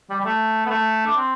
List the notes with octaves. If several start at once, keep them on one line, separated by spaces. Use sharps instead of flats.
G3
G3
A3
B3
A3
D4
C4